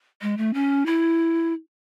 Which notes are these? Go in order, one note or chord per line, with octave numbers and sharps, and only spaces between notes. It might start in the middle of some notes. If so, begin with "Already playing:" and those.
G#3
A3
C#4
E4